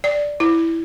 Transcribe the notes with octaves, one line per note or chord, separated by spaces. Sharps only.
D5
E4